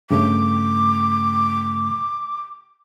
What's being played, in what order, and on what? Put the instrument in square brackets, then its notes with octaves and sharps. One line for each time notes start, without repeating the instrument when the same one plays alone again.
[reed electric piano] G2 C#3 A3 [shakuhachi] D6